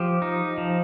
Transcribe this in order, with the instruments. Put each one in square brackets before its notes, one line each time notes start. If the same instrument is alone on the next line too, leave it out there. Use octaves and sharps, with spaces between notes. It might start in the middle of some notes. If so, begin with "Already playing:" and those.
Already playing: [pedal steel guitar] F3 G4
D#4
F3